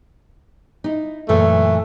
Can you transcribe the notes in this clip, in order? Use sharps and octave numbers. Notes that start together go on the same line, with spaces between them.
D#4 E4
F#2 A#2 E3 A3